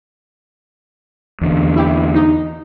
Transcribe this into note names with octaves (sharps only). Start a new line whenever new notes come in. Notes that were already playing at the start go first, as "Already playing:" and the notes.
E2 D3
E4 G4
D#4